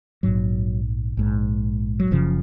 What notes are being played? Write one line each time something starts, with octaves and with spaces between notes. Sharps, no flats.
A#1 G#2 F#3
A#1 G#2
F#3
F#1 F#2 C#3 F3